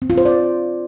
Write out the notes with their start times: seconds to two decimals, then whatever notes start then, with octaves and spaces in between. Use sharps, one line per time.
0.02 C4
0.10 F4
0.18 C5
0.25 D5